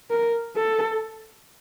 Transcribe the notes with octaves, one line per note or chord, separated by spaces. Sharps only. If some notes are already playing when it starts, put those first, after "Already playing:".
A#4
A4